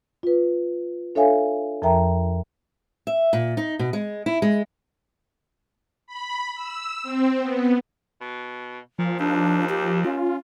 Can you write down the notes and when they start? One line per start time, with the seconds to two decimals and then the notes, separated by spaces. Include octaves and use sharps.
0.23 F4 B4
1.15 D4 A4 C#5 E5 F5 G#5
1.82 F2 F3 A#4 E5 G5 A#5
3.07 E5
3.33 A#2
3.57 D#4
3.79 B2
3.93 G#3
4.26 E4
4.42 G#3
6.07 B5
6.55 E6
7.03 C4
7.41 B3
8.21 B2
8.99 A#2 F3
9.19 D#2 D4
9.69 G4
10.05 C#4 F4